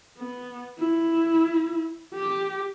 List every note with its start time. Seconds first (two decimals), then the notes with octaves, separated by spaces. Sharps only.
0.17 B3
0.79 E4
2.14 G4